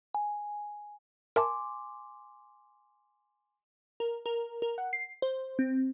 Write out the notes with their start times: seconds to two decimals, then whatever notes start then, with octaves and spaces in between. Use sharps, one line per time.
0.15 G#5
1.36 A#4 E5 G#5 A5 C6 D6
4.00 A#4
4.26 A#4
4.62 A#4
4.78 F#5
4.93 C7
5.22 C5
5.59 C4